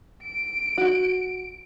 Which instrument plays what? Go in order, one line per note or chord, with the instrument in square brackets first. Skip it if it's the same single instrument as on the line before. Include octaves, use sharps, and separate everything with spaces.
[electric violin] D7
[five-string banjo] F#4